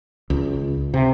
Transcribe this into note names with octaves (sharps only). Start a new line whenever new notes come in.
C#2
C3